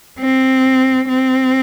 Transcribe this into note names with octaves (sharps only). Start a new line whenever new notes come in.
C4
C4